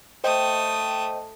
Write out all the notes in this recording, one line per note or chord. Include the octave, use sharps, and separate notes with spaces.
A3 C5 D#5 G5 D#6